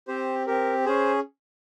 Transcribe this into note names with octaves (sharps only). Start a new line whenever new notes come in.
C4 G4 C5
C4 G4 A#4
C#4 G#4 C5